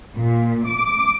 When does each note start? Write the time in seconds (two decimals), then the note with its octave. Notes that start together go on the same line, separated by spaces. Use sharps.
0.15 A#2
0.69 D6